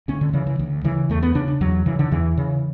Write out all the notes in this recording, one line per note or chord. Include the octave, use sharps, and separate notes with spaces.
D2 C#4
D3
C#3 E3
E3
D2
C#3 E3
E2 A3
B3
C#3 D4
D4
E2 F#3
C#3 E3
D3
E2 E3
C#3